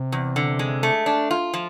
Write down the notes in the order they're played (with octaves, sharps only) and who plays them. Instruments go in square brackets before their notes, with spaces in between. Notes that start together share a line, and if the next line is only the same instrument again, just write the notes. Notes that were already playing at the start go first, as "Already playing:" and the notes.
Already playing: [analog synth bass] C3
[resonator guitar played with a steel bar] E2
D3
G#3
A3
D4
F4
F3